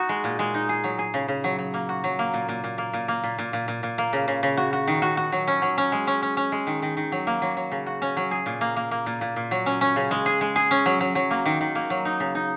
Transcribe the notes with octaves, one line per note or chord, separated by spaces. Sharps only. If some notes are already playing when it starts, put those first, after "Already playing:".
Already playing: D#4 F#4
G#3
A#2
G#3
D#4
G#4
F#3
G#4
C#3
C#3
F#3
F#3
A#3
F#4
F#3
A#3
A#2
A#2
A#2
A#3
A#2
A#3
A#2
A#2
A#2
A#2
A#2
A#3
C#3
C#3
C#3
F#4
F#4
D#3
F#4
F#4
F#3
C#4
F#3
C#4
G#3
C#4
C#4
C#4
G#3
D#3
D#3
D#3
F#3
A#3
F#3
F#3
C#3
F#4
C#4
F#3
G#4
A#2
A#3
A#3
A#3
A#2
A#2
A#2
F#3
C#4
C#4
C#3
G#3
G#4
G#3
G#4
C#4
F#3
F#3
F#3
A#3
D#3
D#3
A#3
F#3
D#4
C#3
D#4